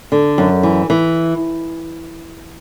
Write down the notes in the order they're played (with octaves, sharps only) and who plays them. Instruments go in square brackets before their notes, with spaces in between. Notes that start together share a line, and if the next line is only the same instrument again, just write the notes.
[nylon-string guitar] D3
F#2
E3
E3